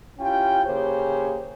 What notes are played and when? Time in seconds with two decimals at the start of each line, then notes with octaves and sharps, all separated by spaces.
0.19 C#4 E4 F4 G4 G5
0.66 C#3 A#3 G4 G#4 C5 C#5